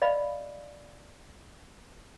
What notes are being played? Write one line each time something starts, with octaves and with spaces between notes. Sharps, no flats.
D5 D#5 F5 B5